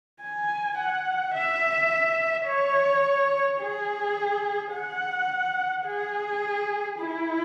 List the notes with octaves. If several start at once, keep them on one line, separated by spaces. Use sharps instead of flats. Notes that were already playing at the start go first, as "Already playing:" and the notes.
G#5
F#5
E5
C#5
G#4
F#5
G#4
E4